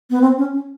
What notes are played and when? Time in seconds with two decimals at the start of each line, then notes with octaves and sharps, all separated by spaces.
0.10 B3
0.21 C4
0.38 C#4
0.53 C#4